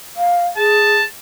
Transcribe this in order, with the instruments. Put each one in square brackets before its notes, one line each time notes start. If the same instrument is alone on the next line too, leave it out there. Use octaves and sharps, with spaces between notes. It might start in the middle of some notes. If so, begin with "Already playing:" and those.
[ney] F5
[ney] G#4 [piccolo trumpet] A5